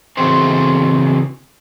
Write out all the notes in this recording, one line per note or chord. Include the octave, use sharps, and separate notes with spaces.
C#3 E3 C4 F#4 G#4 C5